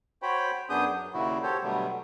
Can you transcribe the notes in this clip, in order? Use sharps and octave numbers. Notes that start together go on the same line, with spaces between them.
F#4 C5 C#5 G5 B5
F#2 B3 D4 G#4 D#6 G6
F#3
D#2 A#2 C#3 E4 F#4
F#4 G4 A4 C5 C#5
B2 D3 F#3 G3 A3 B3